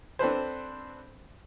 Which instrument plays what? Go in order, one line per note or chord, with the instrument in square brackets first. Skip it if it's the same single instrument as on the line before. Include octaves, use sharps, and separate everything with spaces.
[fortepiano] C4 D4 A4 B4 C5